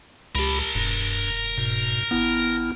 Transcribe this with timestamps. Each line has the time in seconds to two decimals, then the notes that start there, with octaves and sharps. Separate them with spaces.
0.35 C#2 G4 A#4 A5 B5
0.75 E1 G2
1.57 G#2 B2
2.11 G#1 B3 E4 F6